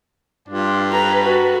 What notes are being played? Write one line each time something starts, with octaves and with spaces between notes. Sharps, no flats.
G2 D4 F4
A4 B4 A#5
F#4